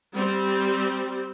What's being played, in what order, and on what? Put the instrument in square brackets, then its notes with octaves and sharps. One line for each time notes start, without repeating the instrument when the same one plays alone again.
[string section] G3 C4